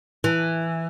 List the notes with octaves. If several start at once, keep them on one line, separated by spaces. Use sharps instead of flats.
E3